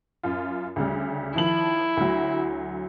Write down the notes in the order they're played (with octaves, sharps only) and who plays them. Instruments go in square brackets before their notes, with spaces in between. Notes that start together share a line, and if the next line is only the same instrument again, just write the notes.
[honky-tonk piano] F#2 F4
D2 C#3 G3
[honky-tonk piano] D#3 F3 F#7 [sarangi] E4
[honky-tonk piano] D2 F#3